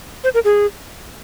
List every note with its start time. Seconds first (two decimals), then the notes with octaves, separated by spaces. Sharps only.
0.24 C5
0.34 A#4
0.45 G#4